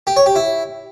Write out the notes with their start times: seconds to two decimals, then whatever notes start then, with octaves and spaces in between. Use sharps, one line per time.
0.07 G4
0.16 C#5
0.26 G4
0.36 E4